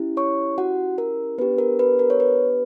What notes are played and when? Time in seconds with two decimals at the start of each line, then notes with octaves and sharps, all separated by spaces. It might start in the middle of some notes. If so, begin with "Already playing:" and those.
Already playing: C#4 E4 G4
0.17 C#5 C#6
0.58 F#4 F#5
0.98 A#4
1.38 B3 D4 G4 B4
1.58 A#4
1.79 B4
1.99 A#4
2.10 C#5
2.20 B4